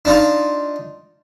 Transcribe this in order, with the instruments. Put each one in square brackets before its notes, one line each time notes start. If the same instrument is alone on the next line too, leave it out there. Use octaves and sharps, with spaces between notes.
[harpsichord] D4 D#4 F4